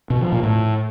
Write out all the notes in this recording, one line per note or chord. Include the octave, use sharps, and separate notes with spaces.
B2
F3
A#2
A2